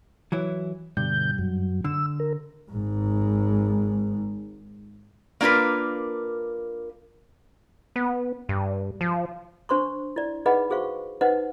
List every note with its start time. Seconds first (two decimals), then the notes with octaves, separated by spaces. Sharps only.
0.32 E3 F#3 E4
0.97 G2 B2 D3 G6
1.38 F#2 F#3
1.84 D3 E6
2.20 A#4
2.71 G#1 G#2
5.41 A#3 D4 F4 A#4 B4
7.96 B3
8.49 G2
9.01 F3
9.69 D4 C5 C6 C#6
10.16 E4 D5
10.46 D#4 G#4 B4 D#5 F#5 B5
10.70 F#4 G#4 C5 F5 C#6
11.21 D#4 B4 C5 D#5 F#5